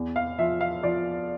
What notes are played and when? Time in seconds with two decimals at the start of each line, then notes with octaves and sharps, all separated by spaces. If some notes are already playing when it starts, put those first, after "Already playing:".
Already playing: E2
0.16 F5
0.39 F3 E5
0.61 F5
0.83 F3 D5